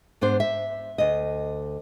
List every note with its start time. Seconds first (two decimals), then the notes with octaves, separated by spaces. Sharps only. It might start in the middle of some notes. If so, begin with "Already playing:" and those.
0.21 G#2 B3 D4 C5
0.40 E5
0.98 D2 D#5